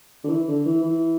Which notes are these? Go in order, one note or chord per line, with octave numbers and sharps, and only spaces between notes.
D3
E3
D3
E3
E3